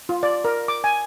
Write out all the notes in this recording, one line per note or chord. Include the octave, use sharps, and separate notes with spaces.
F4
D5
A#4
D6
G#5